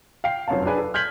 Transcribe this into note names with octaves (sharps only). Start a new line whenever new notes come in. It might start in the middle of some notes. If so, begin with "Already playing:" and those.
F5 G5 C7
F1 F#2 C4 C#5 F5 A5
D4 G#4 B4 G#5
A4
F6 G6 G#6 B6 F#7